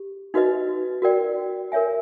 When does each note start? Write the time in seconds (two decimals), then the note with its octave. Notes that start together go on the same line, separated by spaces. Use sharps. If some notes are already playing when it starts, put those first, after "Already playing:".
Already playing: G4
0.34 D#4 F#4 B4 D#5
1.02 F#4 A#4 D5 G5
1.72 A#4 C#5 E5 G#5